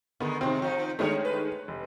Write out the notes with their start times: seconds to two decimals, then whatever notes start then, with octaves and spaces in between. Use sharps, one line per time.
0.20 D3 D#3 G#3 B3
0.41 C3 D#3 G#3 C4
0.62 F3 D#4
0.99 D#3 G#3 A3 D4 C5 C#5
1.25 B4
1.68 F1